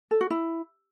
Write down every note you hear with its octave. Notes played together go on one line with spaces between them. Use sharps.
A4
F#4
E4